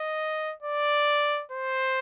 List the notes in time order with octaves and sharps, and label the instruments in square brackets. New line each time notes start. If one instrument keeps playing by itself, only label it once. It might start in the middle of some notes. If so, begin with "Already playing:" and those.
Already playing: [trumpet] D#5
D5
C5